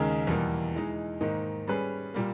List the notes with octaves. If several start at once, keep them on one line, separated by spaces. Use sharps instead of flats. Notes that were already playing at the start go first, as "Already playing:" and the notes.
Already playing: D#2 C#3 G#3 D#4 A#4
E2 B2 G3 A#3
E3 G#3 D#4
G#2 D#3 A#3 D#4
G3 C#4 G#4 B4
A#2 G3 A#3